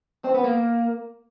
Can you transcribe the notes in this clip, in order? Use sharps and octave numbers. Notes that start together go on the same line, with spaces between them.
C4
B3
A#3